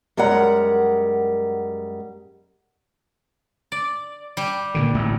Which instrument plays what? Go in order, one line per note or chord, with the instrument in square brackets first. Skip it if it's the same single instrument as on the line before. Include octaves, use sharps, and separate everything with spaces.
[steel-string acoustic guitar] F#2 G3 G#3 A#4 F#5 A#5
[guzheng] D5
G3
[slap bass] A#2 D3 D#3
D1 A1 A3